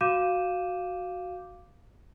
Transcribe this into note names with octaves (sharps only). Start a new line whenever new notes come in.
F#4 F5 D6 G6 D#7 E7